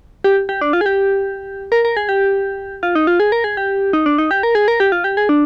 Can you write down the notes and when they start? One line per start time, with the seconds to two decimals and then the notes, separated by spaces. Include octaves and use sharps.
0.24 G4
0.49 G4
0.61 D4
0.73 F4
0.81 G#4
0.86 G4
1.72 A#4
1.85 A#4
1.97 G#4
2.09 G4
2.83 F4
2.95 D#4
3.07 F4
3.20 G#4
3.32 A#4
3.44 G#4
3.57 G4
3.93 D#4
4.06 D4
4.18 D#4
4.31 G4
4.43 A#4
4.55 G#4
4.68 A#4
4.80 G4
4.92 F4
5.04 G4
5.17 G#4
5.29 D4